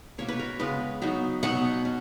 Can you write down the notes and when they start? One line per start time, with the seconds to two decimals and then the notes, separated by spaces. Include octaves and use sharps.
0.18 B2 A#3 C#4 C#5
0.28 B4
0.39 A#4
0.59 C#3 G#3 B3 B4
1.02 F#3 B3 D#4
1.43 B2 F#3 B3 D#4 F#5
1.85 C#4